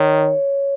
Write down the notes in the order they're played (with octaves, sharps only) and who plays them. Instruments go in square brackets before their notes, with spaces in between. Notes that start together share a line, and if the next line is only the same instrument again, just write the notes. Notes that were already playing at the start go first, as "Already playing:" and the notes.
Already playing: [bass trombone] D#3 [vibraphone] C#5